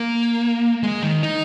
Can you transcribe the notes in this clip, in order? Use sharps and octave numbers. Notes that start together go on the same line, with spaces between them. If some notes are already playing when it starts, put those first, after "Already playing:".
Already playing: A#3
G#3
D#3
D#4